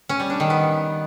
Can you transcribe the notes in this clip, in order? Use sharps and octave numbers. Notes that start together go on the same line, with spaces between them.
C#4
G3
D4
D#3
B3